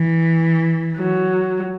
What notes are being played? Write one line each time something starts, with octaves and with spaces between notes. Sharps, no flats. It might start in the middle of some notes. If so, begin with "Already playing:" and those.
Already playing: E3
F#3